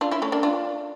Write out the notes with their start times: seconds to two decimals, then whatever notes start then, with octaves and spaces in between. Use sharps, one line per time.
0.01 D4 F4
0.11 C#4 E4
0.22 A3 C#4
0.32 A#3 D4
0.43 D4 F4